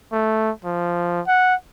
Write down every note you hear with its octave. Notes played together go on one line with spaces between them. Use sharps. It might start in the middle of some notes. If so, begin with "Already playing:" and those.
A3
F3
F#5